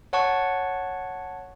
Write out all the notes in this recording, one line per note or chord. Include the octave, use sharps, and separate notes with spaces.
C#5 F#5 A5 C#6